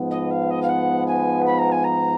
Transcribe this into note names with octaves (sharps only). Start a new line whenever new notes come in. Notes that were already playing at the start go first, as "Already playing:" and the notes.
Already playing: G#2 F3 B3
D#5
F5
D#5
F5
F#5
G#5
B5
A#5
G#5
A#5